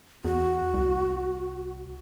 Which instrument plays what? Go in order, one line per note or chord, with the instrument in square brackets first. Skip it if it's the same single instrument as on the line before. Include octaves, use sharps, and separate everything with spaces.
[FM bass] E2 [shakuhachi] F#4
[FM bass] C2